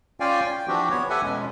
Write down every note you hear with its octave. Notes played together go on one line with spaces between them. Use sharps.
C#4 F4 D5 F5 G5 G#5
G5
E3 F3 C4 D4 F#4 G4
B3 C#5
G4 A4 B4 E5 F#5 G#5
F2 B2 F3 G#3 C#4